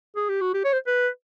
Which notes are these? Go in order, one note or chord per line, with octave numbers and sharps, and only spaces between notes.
G#4
G4
F#4
G4
C#5
C5
B4